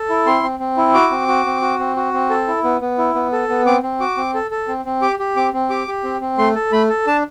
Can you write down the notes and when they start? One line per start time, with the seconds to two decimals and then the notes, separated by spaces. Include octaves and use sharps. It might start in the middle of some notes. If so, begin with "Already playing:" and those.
Already playing: A4
0.09 E4
0.26 C4 C6
0.43 C4
0.60 C4
0.77 E4
0.94 F#4 D6
1.11 C4
1.28 F#4
1.46 C4
1.61 F#4
1.79 C4
1.96 F#4
2.13 C4
2.30 A4
2.47 E4
2.64 B3
2.81 B3
2.98 E4
3.15 B3
3.32 A4
3.49 B3
3.66 C4 D6
3.83 C4
4.00 F#4 D6
4.17 C4
4.34 A4
4.51 A4
4.68 C4
4.85 C4
5.02 G4 D6
5.19 G4
5.36 C4 D6
5.53 C4
5.70 G4 D6
5.88 G4
6.04 C4
6.21 C4
6.38 A3 C6
6.55 A4
6.72 A3 B5
6.89 A4
7.07 D4 A5